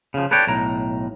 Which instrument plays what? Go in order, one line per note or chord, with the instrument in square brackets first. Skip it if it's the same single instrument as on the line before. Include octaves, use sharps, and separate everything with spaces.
[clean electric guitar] C#3 F3
A4 B4 C#5 D5 G5
B1 A2 A#5